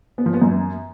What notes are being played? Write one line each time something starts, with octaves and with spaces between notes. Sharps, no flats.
B3
F3
B3
F#2